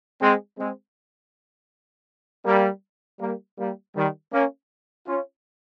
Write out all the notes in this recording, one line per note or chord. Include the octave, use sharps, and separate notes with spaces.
G#3 C4
G#3 C4
G3 A#3
G3 A#3
G3 A#3
D#3 G3
A#3 C#4
C#4 F4